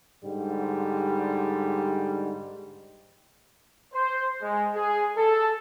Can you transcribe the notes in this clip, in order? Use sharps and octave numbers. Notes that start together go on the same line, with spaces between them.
G#2 D3 G3
C5
G#3
G#4
A4